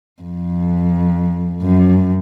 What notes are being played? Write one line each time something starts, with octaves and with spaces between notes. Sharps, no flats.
F2
F#2